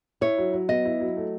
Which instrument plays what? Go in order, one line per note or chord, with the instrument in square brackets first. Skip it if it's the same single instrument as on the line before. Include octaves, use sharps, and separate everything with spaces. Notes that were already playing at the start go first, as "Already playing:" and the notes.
[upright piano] E4 [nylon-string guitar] C#5
[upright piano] F#3
F#3
[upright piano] B3 [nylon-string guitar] D#5
[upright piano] E4
F#3
A3